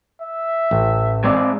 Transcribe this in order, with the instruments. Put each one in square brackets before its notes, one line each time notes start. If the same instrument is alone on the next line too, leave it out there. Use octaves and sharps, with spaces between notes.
[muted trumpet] E5
[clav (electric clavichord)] A1
[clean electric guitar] G#3 C4 D5